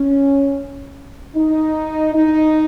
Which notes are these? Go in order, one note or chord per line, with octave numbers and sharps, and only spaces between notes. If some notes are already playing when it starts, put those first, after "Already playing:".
Already playing: C#4
D#4
D#4